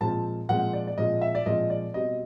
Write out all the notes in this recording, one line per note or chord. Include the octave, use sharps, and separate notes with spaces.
A#2 F3 G#3 C4 A5
A#2 F3 G#3 C4 F#5
D5
D5
A#2 F3 G#3 C4 D#5
E5
D5
A#2 F3 G#3 C4 D#5
D5
B2 G3 C4 D#5